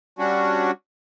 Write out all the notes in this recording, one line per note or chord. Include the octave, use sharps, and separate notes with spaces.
G3 C#4 D4 F#4